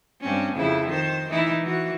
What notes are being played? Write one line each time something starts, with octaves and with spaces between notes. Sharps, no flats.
G2 C4 C#4
F2 C#3 E4
D#3 C5
E3 D#4 E4
E3 F#4